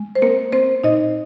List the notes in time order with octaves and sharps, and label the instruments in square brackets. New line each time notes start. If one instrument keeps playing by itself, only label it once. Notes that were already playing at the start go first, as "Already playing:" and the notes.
Already playing: [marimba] G#3
C5
A#3 C4 A#4
C4 C5
A#2 D#4 D#5